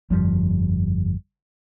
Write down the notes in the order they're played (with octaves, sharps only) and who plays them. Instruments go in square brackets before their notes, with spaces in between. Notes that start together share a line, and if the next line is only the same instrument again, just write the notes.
[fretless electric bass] G1 F2 F3 G3